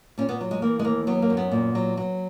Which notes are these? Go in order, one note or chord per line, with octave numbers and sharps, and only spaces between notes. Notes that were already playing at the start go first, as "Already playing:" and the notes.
A#2 C#4
B3
F#3
G#3
E3 A#3
G#3
D#2 A#3
F#3 B3
A#3
F#2
B3
A#2
F#3
F#3